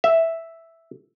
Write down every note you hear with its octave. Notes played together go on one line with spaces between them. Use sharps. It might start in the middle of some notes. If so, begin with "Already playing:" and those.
E5